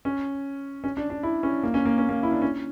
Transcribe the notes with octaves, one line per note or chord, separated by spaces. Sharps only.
C#4
C#4
D4
D4
E4
C#4
A#3
C#4
A#3
C#4
A#3
E4
D4
C#4